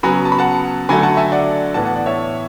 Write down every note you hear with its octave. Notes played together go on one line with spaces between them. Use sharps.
C#3 F#3 B3 G#5 B5
A5
B5
F#5 A5
D3 F#3 A3 G#5 B5
F#5 A5
E5 G#5
D5 F#5
A2 E3 B3 F#5 A5
F#5 A5
D5 F#5
C#5 E5